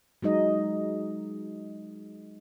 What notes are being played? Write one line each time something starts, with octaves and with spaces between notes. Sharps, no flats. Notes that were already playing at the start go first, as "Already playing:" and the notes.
F#3 G#3 D#4 D#5